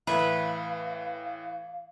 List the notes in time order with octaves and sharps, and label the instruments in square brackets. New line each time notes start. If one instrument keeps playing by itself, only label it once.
[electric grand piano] A2 E3 [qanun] B4 E5 [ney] F5